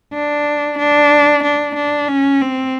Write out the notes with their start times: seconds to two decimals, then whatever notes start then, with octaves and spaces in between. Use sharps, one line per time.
0.14 D4
0.79 D4
1.44 D4
1.76 D4
2.08 C#4
2.41 C4